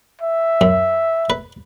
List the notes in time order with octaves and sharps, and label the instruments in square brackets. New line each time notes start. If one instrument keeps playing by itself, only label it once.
[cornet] E5
[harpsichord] F#2
B4